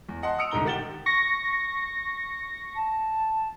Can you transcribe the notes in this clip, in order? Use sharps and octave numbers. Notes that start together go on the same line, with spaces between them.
E2
D#5 F#5 A5 C6
D#6 E6 C#7 D7 F7
C2 G#2 D3 D#4 A#5 G7
D#3 G4 F#5 A6 E7 G7
C#6 A#6
A5